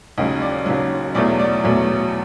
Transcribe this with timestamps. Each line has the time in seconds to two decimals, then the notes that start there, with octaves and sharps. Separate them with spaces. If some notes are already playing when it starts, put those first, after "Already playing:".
0.18 D#2 C#3 F#3 D#5
0.42 D5
0.66 D#2 C#3 F#3
1.15 E2 B2 F#3 A3 D5
1.39 D5
1.64 E2 B2 F#3 A3